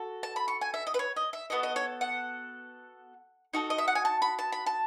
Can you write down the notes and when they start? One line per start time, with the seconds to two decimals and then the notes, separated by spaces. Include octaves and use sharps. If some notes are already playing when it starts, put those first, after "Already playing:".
Already playing: F#4 A4
0.23 A5
0.36 B5
0.48 C#6
0.61 G#5
0.74 E5
0.87 D#5
0.94 B4
0.99 C#5
1.16 D#5
1.33 E5
1.50 B3 F#4 A4 D#5
1.63 D#5
1.76 C#5
2.01 F#5
3.53 D#4 F#4 A4
3.70 D#5
3.78 E5
3.88 F#5
3.95 G#5
4.05 A5
4.22 B5
4.39 A5
4.53 B5
4.67 A5